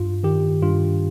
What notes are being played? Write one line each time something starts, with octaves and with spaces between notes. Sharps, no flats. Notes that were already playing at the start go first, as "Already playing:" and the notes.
Already playing: G2 F4
D#3 G4
G2 F4